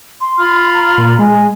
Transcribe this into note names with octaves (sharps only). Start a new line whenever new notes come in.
C6
F4 B5 F6
A#5
A#2
G#3 G#5